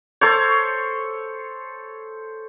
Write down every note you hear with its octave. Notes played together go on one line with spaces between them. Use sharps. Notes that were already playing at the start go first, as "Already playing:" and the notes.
A4 C5 C#5